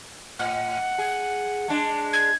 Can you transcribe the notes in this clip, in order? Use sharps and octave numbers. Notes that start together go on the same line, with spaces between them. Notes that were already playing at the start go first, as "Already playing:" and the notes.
A2 F#5
G#4
G#3 D4
G#6